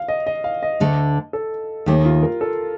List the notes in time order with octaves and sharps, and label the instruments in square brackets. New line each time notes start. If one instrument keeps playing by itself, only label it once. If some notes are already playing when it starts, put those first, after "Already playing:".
Already playing: [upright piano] F5
D#5
D#5
F5
D#5
[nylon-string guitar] D2 D3 A3
[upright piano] A4
[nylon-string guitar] D#2 D#3 A3 [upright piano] G4
[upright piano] F4
A#4
A4